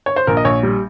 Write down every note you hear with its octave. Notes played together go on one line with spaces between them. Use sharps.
C#5
C5
A#1 A#4
D#5
A#1 C#5
G3